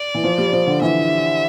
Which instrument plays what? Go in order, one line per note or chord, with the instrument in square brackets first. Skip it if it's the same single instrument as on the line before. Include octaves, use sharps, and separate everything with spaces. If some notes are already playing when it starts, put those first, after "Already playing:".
Already playing: [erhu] D5
[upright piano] E3
F3
G3
F3
D3
[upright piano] E3 [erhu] E5